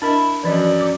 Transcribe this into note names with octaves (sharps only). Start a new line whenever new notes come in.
D4 E4 A#4 D#5
F#2 E3 F3 D5 D#5
D6